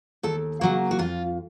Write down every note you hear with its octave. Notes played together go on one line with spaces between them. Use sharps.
D#2 A4
C#3 F#3 A#3 F#4
F#4
F2 F4